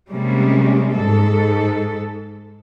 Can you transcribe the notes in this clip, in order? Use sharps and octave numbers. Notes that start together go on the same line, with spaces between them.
C3 G3 G#3 A#3 C#4
G#2 A4